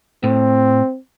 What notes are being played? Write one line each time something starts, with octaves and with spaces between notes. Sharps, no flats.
A2 C4